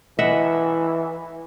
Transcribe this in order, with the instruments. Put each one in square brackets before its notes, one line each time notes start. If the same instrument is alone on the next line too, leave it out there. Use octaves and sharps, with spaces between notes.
[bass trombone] E3 [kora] D#5 E5 F#5